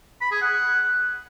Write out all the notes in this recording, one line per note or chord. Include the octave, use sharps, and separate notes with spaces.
B5
G#4
F#5